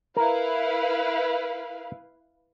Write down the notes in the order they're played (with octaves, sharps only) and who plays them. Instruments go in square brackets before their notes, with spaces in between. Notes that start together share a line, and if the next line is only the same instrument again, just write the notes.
[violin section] E4 B4 F5 [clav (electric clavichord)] A#4